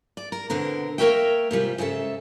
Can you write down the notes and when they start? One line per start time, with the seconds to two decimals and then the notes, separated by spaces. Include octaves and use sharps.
0.17 D5
0.32 A#4
0.50 B2 D3 C4 A#4
0.98 A#3 A#4 B4 C#5 E5 G5
1.51 G#2 C3 G3 F4
1.78 G#2 C#3 G#4 A4 E5